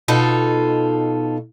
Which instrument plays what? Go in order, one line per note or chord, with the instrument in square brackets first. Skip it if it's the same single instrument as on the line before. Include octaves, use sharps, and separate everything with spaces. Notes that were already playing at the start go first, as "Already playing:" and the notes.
[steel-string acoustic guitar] B2 D#4 F4 A4